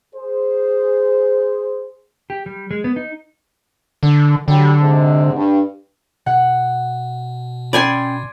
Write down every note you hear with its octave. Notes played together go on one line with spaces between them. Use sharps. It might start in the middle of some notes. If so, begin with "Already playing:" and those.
G#4 C5
G4
G3
G#3
B3
D#4
D3
D3 F#3 G3
G#2 C3 G#3
G2
B2 F#5
C#4 D5 G5 G#5 B5 C6